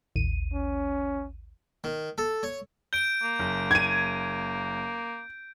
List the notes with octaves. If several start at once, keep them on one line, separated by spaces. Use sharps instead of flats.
A1 D#2 D#7
C#4
D#3
A4
C#5
G6 D7 G7
A#3
F#1
G#6 D#7